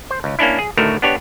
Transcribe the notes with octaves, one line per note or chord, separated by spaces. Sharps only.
C5
C#2
A#3 C#4 D4 E4
G#4
D2 A2 D#3 A3 F#4 A#4
B3 D4 G4 C#5